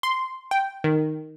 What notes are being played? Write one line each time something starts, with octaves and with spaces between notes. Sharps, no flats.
C6
G5
D#3